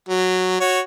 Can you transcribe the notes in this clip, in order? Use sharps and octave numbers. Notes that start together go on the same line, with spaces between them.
F#3
F#4 C#5